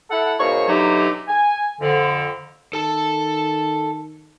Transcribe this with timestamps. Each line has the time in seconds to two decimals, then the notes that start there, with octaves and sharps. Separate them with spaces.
0.10 E4 A4 F#5
0.39 G#2 B2 A#3 F#4 C#5 C#6
0.68 B2 D3 E3 F#3 D#4 G4
1.28 G#5
1.81 F2 D3
2.73 D#3 A4 A5